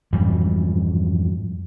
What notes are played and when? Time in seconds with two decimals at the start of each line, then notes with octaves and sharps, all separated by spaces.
0.13 F2 G#2 E3 G3